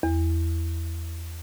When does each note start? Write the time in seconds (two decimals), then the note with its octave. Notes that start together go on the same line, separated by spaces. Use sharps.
0.03 E2